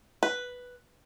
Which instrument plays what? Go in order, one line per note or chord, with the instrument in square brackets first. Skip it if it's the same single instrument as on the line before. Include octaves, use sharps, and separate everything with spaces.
[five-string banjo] B4